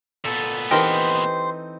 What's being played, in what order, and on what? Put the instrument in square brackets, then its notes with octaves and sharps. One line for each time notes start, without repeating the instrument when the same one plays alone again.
[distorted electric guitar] A#2 B3 [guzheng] A4
[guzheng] E3 C4 D#4 [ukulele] G4 A#4 A5 [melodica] C5